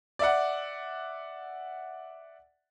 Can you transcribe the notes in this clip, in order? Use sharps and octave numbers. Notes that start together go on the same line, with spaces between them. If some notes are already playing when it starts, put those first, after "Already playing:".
D5 E5 F#5